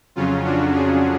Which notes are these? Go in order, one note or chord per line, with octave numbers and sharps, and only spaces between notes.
F2 C#3 F#3 C#4 F4
D4 F#4
F4 G#4